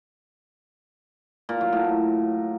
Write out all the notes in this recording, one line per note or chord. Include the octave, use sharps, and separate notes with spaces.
A#2
F#3
A2